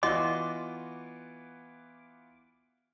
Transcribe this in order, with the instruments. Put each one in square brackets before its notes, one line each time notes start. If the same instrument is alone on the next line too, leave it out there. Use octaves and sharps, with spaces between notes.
[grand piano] E3 B3 F4 [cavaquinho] F#4 C6 [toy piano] D#5 [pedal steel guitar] D6